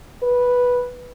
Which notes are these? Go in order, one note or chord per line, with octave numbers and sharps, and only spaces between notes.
B4